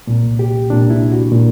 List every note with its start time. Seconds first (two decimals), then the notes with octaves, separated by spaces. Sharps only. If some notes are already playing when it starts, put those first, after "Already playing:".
0.07 C2 A#2
0.39 G4
0.70 C2 A#2 D4
0.90 E4
1.12 F#4
1.32 A#2